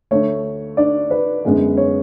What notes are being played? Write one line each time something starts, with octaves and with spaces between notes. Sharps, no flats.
D2 D3 A3 C#5
D4 D5
B4
F#2 D3 G#3 B3
C#5